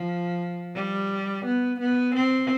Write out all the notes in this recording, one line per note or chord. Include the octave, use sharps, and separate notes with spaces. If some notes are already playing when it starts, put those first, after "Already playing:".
Already playing: F3
G3
B3
B3
C4